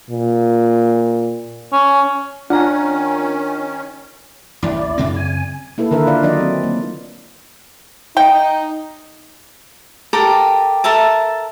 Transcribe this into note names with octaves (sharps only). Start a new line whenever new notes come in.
A#2
C#4
D#3 C#4 D4 F4 F#5 G#5 A#5
A1 D#2 E4 D5
F#2 C#3 C4
G#5
A#3 E4 A4 B4
D3 D#3 A#4 B4 E5
F4 D5 F5
D#3 F#3 D4 F4 D5 D#5
C4
A#3
D#4 G5
G4 A4 A#4 G5
A4 A#4 E5 A5